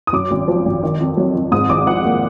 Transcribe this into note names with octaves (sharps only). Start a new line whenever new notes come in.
D#6
F#2 D6
G#1
F3
G#1
D#3
F2
F#3
F2
G#2 D#6
G#1 D6
F3 F#5
A#3